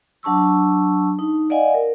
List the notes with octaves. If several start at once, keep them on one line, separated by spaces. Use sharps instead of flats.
F#3 D4 A5 C#6 E6
D#4
D5 D#5 F5 F#5 G#5
A#4